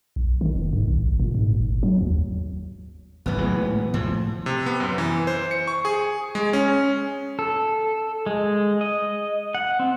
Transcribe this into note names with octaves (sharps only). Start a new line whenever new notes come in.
A#1
D#3
F1
G#2
B1
G#1
A#2
G#2
G1
F#3
D#2
G#1 C#2 E3 B3
A2 F#3 G#3
A2 F3
C3
B3
F#2
E3
C5
C#7
C#6
G#4
G#3
C#4
A4
G#3
D#5
F#5
C4